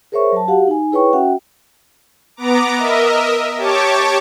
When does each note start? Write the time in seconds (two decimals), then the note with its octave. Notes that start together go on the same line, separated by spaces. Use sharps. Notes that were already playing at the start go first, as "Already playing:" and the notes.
0.12 G#4 A#4 C5 C#5 E5 C#6
0.32 F#3 A5
0.48 F#4 G4 F5 F#5
0.67 D#4 G#5
0.92 E4 G#4 B4 C#5 G5 C#6
1.13 C#4 F#4 E5 F#5 G5
2.36 B3 A#5 D6
2.78 A#4 D#5 E5
3.58 G4 C#5 A5 C#6 D6